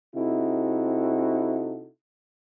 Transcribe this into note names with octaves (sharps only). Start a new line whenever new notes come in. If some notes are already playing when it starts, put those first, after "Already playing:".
C3 C4 D#4 E4 F#4 A4